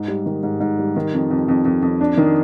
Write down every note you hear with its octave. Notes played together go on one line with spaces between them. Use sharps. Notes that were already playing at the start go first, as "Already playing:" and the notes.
Already playing: G#2
G3
D#3
G#2
G#2
G3
D#3
F2
F2
F2
F2
F2
D4
D#3